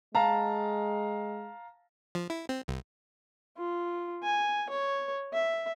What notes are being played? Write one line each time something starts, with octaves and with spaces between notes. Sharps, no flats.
G#3 F5 A5 A#5
F3
E4
C4
C2
F4
G#5
C#5
E5